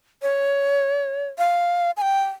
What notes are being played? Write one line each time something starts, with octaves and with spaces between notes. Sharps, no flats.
C#5
F5
G#5
G5